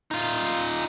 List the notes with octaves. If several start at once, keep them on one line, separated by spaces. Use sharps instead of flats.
D#4 F4